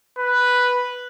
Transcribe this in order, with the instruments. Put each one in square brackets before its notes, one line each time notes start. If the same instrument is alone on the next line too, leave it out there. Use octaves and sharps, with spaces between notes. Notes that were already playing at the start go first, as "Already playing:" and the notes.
[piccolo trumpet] B4